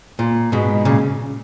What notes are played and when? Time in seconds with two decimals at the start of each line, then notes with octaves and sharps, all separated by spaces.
0.19 A#2
0.52 G#2 B2
0.85 A#2 C#3